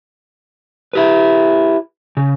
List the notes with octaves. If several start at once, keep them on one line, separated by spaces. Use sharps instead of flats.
E4 G4 B4
C#3